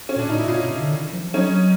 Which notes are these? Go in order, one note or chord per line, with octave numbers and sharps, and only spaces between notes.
C#4
A#2 D4
A2 D#4
E4
A#2 D#4 F4
B2
C3
D3
D#3
F3
F#3 C#4 D#4
F#3